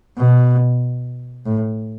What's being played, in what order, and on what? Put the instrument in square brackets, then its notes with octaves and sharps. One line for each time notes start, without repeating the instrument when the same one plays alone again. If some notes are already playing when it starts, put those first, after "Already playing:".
[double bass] B2
A2